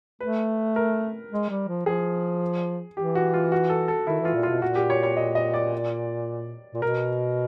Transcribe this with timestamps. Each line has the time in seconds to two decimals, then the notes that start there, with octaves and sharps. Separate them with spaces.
0.20 A3 B4
0.76 A#4
1.31 G#3
1.50 G3
1.68 F3
1.86 F3 G#4
2.97 E3 G4
3.15 F#4
3.34 F4
3.52 F#4
3.70 A4
3.88 A4
4.07 D#3 E4
4.21 E3 F4
4.34 A#2
4.43 F4
4.49 B2
4.62 A#2 F#4
4.75 G4
4.90 C#5
5.03 C#5
5.17 D#5
5.35 D#5
5.54 D5
6.74 A#2
6.82 B2 A#4